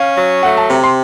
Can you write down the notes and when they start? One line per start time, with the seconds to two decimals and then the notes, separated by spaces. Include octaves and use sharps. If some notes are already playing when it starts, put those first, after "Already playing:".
Already playing: C#4 F5
0.17 F#3
0.43 A3 F#5
0.57 A5
0.69 C3 A#5
0.84 C6